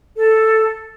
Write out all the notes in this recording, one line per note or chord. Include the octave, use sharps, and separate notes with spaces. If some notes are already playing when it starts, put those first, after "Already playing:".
A4